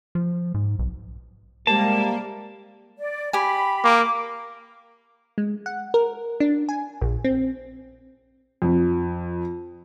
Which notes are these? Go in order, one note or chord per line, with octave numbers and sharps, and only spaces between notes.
F3
G#2
B1
C3 G3 G#3 A#3 A5
D5
G4 G#5 B5
A#3 D6
G#3
F#5
A#4
D4
G#5
A#1
C4
F2